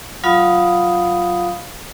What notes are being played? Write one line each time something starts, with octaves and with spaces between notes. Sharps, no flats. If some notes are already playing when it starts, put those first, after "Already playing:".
F#3 F4 F5 B5 D#6